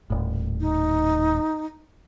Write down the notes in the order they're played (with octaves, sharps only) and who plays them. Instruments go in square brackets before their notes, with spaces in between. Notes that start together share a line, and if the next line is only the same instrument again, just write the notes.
[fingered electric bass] D#1 A2
[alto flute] D#4